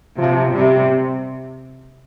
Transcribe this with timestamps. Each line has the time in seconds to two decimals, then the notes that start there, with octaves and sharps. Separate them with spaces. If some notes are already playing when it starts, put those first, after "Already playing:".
0.18 C3 F3
0.54 C3 G3